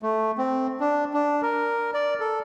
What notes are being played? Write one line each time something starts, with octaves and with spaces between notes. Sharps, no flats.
A3
C4
D4
D4
A#4
D5
A4